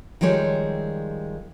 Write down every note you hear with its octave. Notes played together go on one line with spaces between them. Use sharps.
D#3 F3 G3 G#3 C#5